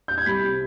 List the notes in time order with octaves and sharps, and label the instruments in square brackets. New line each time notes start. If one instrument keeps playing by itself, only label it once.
[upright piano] G6
G#6
C2 B5 B6
C3